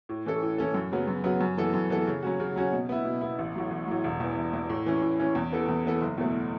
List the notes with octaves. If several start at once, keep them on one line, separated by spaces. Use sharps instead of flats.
A2
E3 C#4 A4
A2
E3 C#4 A4
F#2
C#3 F#3 B3
F#2
C#3 F#3 B3
F#2
E3 B3 A4
F#2
E3 B3 A4
C#3
F#3 C#4 F#4
C#3
F#3 C#4 F#4
B2
B3 E4
B2
B3 E4
A1
A2 F#3
A1
A2 F#3
E1
E2 E3
E1
E2 E3
A2
E3 C#4
A2
E3 C#4
E2
E3 B3 A4
E2
E3 B3 A4
F#1
E2 B2 A3